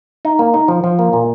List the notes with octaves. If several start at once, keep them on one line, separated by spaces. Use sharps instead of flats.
D#4
A#3
D#4
F3
F3
A#3
A#2